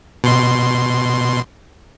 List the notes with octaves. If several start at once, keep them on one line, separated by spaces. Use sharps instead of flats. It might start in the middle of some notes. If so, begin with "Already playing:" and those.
B2 C6